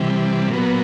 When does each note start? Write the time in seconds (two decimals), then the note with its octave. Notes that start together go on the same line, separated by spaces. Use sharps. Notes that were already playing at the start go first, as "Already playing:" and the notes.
Already playing: C3 E3 G3
0.49 A#2 F#3 B3